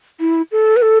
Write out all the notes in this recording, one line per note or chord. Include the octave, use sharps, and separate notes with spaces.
E4
A4
B4
A4